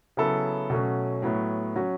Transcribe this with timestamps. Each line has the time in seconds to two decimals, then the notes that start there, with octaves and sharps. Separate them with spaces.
0.17 C#3 F#3 B3 E4 A4
0.70 B2 F#3 A3 C#4
1.22 A2 F#3 B3
1.76 F#3 C#4 F#4